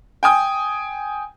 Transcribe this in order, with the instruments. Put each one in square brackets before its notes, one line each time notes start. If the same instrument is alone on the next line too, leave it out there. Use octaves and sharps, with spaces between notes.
[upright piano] G5 G#5 D#6